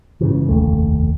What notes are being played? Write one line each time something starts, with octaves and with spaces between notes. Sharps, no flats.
G#2 C#3 E3
F1 A#1 D#2 A3